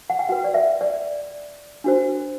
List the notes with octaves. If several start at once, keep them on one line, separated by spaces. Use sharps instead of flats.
F#5
G5
F#4 B4 F#5
D5
E5
D5
D4 F#4 C5